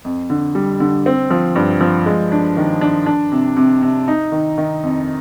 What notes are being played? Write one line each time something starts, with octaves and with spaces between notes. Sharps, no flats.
F2
D3
G3
D3
C4
F3
G2
F3
G#3
D4
D#3
D4
D4
C3
C3
C3
D#4
D#3
D#3
F2